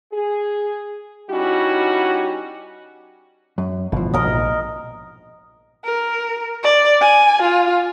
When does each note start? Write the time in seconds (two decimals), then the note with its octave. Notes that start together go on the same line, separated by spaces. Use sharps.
0.12 G#4
1.29 G3 C#4 D#4 E4 F#4
3.58 F#2
3.92 G1 B2 E3 F3
4.14 A#1 G#2 C3 A#4 D#5
5.85 A#4
6.63 D5
7.01 G#5
7.43 F4